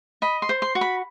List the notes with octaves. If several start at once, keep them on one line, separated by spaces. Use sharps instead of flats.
D#5 B5
C6
C5
C6
F#4
B5